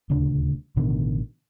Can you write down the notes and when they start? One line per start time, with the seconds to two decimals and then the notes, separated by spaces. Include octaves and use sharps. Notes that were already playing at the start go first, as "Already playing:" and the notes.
0.10 D#1 D2 C#3 D4
0.76 A1 B2 D3 D#3